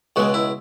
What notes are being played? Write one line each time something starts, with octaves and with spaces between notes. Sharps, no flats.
C#2 B2 G#3 F#4
E4